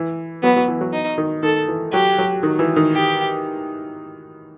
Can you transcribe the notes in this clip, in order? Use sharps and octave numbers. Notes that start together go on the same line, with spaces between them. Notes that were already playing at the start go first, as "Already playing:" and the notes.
Already playing: E3
F#3 B3
F#3
E3
F#3
D#4
D#3
D#3 A4
E3
F#3 G4
F#3
D#3
E3
D#3
G4